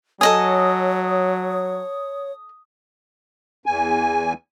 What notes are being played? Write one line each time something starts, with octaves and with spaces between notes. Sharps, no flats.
F#3 A4 C#5 D#5 G#5 D#6
E2 G#5